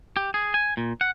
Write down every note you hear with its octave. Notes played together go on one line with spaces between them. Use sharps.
G4
G#4
G#5
A#2
F#5